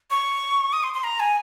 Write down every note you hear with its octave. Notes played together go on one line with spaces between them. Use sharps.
C#6
D#6
C6
C6
A#5
G#5